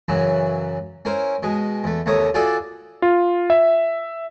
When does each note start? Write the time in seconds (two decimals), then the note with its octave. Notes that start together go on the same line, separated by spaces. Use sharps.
0.08 F#2 C#3 E3 F#3
1.05 C#4 E4 A#4 C5
1.43 B2 G#3
1.84 E2 A3
2.06 D#2 C3 A3 C#5 A#5 D#6
2.34 F4 F#4 G#4 A4 D5 E5
3.02 F4
3.50 E5